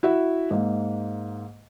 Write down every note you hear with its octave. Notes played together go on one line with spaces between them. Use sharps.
E4 F#4 E5
G#2 A#3